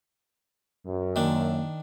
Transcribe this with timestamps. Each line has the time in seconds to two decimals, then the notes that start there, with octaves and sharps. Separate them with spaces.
0.86 F#2
1.16 D#3 A#3 D4